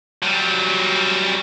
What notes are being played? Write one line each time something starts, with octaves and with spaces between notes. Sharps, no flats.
F#3 G3